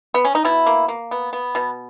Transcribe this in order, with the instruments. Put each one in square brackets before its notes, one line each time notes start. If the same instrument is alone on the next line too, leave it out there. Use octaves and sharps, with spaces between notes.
[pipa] B3
C#4
D#4
B2 E4
A#3
A#3
B3
B3
B2